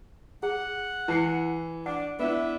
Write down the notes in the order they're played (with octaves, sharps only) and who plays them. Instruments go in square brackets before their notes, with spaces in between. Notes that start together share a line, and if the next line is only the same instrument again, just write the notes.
[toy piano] G#4 [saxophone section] F#5
[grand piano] E3 C7 C#7 [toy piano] E4
[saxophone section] D4 D5 [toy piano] F#5
[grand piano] B3 E4 [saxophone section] D4 B4 E5